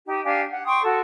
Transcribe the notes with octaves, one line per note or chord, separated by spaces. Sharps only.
D#4 G4
D4 G4 F5 G#5
F#5
G5 C6 C#6 D#6
F#4 A4